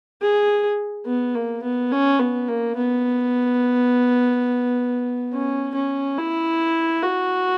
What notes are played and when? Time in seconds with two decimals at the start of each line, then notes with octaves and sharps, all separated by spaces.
0.22 G#4
1.06 B3
1.35 A#3
1.63 B3
1.91 C#4
2.20 B3
2.48 A#3
2.76 B3
5.33 C#4
5.74 C#4
6.18 E4
7.02 F#4